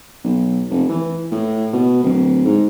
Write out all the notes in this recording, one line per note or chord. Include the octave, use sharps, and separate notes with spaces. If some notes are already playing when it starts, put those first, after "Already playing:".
B1
F1
E3
A2
B2
D1
G#2